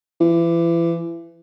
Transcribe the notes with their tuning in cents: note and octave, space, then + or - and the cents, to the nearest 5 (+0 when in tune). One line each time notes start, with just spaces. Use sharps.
E3 +30